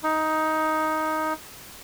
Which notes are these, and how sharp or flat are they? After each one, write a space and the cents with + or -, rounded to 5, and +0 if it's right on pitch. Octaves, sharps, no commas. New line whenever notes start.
D#4 +10